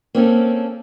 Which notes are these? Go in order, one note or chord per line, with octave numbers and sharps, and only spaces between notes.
A#3 C4 C#4 A4